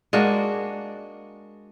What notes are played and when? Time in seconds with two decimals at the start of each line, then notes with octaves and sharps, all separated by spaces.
0.13 G#3 A#3 D4 F#4